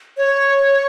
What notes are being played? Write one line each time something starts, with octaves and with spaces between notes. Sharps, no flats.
C#5